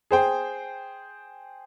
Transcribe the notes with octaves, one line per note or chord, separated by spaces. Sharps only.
G#4 C5 G5